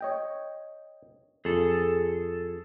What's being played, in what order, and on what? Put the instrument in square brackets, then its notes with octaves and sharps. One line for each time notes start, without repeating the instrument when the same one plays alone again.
[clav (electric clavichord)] C#5 D#5 G5
[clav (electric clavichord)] F2 [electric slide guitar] G#4 A4